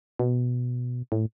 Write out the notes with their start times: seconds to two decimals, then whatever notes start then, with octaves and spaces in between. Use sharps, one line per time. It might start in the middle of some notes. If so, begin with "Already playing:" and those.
0.19 B2
1.12 A2